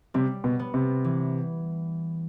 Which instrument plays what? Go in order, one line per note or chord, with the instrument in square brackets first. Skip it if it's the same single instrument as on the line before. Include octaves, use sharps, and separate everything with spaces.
[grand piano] C3 [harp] G3
[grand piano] B2
[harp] B3
[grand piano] C3
[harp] E3